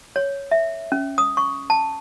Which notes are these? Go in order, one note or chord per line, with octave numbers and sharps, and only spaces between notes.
C#5
E5
C#4
D#6
C#6
A5